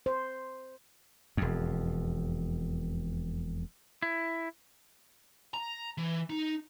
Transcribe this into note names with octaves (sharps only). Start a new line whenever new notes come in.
C5
E1 F2
E4
A#5
E3
D#4